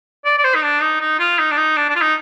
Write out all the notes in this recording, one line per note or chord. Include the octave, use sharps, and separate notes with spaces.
D5
D5
C5
D#4
D4
D#4
D#4
F4
D#4
D4
D#4
D4
D4
F4
D#4